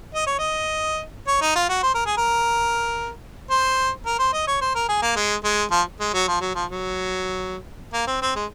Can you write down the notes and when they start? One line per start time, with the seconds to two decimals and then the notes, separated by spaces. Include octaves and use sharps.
0.15 D#5
0.27 C#5
0.39 D#5
1.28 C#5
1.42 D#4
1.55 F4
1.69 F#4
1.83 C5
1.94 A#4
2.06 G#4
2.17 A#4
3.50 C5
4.06 A#4
4.19 C5
4.33 D#5
4.47 C#5
4.61 C5
4.75 A#4
4.89 G#4
5.02 A#3
5.16 G#3
5.44 G#3
5.71 F3
6.00 G#3
6.14 F#3
6.28 F3
6.41 F#3
6.55 F3
6.69 F#3
7.94 A#3
8.07 C4
8.22 C4
8.36 G#3